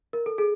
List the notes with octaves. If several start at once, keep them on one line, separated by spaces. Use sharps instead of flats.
A#4
A4
G#4